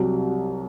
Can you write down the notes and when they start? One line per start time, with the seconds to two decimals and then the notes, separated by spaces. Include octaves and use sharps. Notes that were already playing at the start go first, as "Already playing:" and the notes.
Already playing: C2 C3 F#3